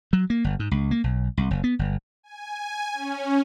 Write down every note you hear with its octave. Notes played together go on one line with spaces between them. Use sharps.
F#3
A#3
G1
G#2
C#2
A#3
B1
C2
F#1
B3
G1
G#5
C#4